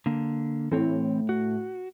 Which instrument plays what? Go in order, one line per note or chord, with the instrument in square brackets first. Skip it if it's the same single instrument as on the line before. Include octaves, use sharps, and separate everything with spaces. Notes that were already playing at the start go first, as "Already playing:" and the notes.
[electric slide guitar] D3 A#3
[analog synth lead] A2 [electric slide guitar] E3 C4 C#5
[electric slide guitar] F#4